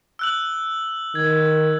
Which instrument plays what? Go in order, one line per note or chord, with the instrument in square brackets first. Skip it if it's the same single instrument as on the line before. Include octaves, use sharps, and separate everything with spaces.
[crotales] E6 F#6 F#7
[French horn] D#3 [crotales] G#6